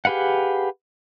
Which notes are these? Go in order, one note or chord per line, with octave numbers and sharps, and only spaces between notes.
G4 G#4 B4 F5 F#5